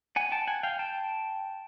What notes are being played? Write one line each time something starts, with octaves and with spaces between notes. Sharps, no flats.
F#5 G#5
G5 A5
F#5 G#5
F5 G5
G5 A5